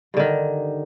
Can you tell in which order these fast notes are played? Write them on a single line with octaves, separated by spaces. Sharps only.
G2 D3 D#3